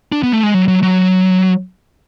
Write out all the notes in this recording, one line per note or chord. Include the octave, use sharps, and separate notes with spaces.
D4
B3
A3
G#3
F#3
F#3
F#3